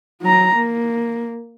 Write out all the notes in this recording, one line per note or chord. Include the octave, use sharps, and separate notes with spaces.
F#3 A#5
A#3